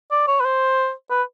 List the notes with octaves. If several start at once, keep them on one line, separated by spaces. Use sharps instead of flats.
D5
C#5
B4
C5
B4